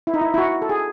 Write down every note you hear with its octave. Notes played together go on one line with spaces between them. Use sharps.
E4
D#4
E4
E4
F#4
A4
G#4